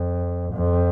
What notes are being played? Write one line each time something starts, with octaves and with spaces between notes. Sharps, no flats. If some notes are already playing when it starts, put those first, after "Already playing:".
Already playing: F2
F2